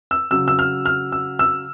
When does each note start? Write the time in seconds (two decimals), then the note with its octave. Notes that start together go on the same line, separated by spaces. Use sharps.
0.11 E6
0.31 C#3 F#3 E6
0.48 E6
0.59 F6
0.86 F6
1.12 E6
1.39 E6